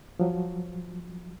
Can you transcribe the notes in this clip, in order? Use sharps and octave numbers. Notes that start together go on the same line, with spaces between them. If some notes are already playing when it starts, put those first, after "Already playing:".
F3 F#3